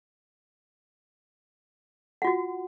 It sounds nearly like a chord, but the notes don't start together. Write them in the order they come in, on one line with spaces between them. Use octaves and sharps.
F#5 F4 F#4